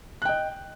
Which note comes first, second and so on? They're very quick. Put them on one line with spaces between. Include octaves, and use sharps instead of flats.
F#6 G5 D#5